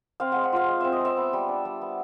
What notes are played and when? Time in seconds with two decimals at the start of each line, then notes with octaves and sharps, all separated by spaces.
0.20 C4 F5
0.32 G#3 F#5
0.44 F#5
0.53 F4 F5
0.68 G#3
0.80 C4 E5
0.93 D#5
1.00 G#3 E5
1.17 B3
1.33 G3
1.49 D4
1.65 G3
1.81 B3